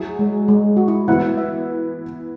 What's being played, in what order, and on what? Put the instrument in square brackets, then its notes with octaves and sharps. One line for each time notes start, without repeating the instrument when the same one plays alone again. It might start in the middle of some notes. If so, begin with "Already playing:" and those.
Already playing: [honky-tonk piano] F#3 E4 G#4
[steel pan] G#3
G#3
F#4
E4
[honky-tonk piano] E3 B3 E4 B4 [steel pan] F#5
[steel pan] E5